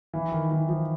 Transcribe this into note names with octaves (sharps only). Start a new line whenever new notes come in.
E3
D#3
E3
F3